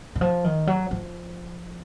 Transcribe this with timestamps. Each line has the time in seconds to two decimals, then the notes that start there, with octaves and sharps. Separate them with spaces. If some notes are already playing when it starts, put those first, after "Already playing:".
0.15 D#3
0.21 F3
0.44 D#3
0.67 F#3
0.91 F3